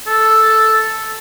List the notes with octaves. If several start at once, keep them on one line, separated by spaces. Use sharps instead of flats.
A4